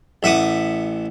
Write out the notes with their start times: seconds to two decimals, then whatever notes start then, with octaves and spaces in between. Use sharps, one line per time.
0.23 A1 E5 F#5 D6 D#6